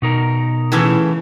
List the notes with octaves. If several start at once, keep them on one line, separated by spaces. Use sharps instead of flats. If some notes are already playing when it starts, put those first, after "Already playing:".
B2 D#4 A#4
A2 C#3 E3